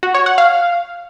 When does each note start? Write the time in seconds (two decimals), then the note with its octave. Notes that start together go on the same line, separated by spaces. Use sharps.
0.03 F#4
0.14 C#5
0.26 F#5
0.38 F5